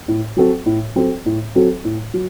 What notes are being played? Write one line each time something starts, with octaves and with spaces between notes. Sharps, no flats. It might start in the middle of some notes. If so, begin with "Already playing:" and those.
A2
F#3 C4 F#4 A4
A2
F#3 C4 F#4 A4
A2
F#3 C4 F#4 A4
A2
F#3